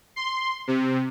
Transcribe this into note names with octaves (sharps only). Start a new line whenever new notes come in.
C6
C3